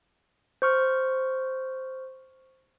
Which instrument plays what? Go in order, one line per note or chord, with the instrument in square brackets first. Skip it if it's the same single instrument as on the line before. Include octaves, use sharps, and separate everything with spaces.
[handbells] C5 C#6 F6